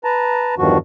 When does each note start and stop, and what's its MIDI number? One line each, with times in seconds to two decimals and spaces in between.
0.04 0.55 71
0.04 0.55 81
0.04 0.55 82
0.58 0.78 40
0.58 0.78 43
0.58 0.78 51
0.58 0.78 53
0.58 0.78 66